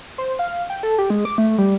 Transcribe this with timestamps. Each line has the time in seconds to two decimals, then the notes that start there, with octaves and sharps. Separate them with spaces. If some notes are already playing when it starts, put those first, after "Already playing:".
0.18 C5
0.39 F5
0.70 G5
0.83 A4
0.98 G4
1.10 G#3
1.25 D6
1.38 A3
1.58 G3